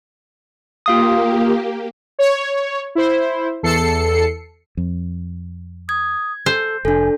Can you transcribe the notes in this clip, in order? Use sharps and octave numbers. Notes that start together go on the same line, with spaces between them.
A#3 F4 G4 F5 D#6
C#5
E4 C5
E2 A4 C7 C#7
F2
D#6 G#6
A4 C5
F1 D4 A4 G#5